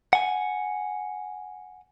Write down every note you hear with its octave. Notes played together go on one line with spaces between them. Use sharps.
F#5 G#5